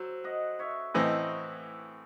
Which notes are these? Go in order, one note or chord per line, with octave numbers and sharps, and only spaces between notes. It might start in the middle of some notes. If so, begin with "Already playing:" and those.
Already playing: F#3 A4 C5
D#5 F#5
C#5 E5
A2 E3 C4 D#5 F#5